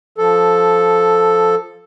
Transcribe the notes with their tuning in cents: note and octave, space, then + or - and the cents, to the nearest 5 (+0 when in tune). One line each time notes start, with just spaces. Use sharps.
F3 +0 A4 +0